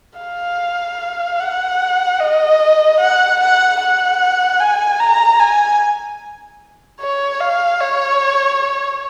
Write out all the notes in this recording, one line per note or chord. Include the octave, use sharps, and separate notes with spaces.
F5
F#5
D#5
F#5
F#5
F#5
G#5
A#5
G#5
C#5
F5
C#5